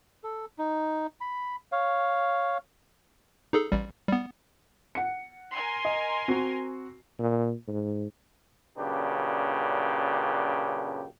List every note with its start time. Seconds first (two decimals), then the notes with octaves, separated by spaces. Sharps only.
0.24 A4
0.58 D#4
1.21 B5
1.72 C#5 F5
3.53 D#4 G#4 A4
3.72 A1 G3
4.09 G3 B3
4.95 F#5 C#7
5.53 A#4 G#5 C6
5.85 D#5
6.28 C4 F#4 C7
7.19 A#2
7.68 G#2
8.77 F#2 A#2 C#3 D4 G4 B4